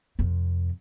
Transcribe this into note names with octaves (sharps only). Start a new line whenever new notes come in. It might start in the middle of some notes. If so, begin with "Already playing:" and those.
F2 C3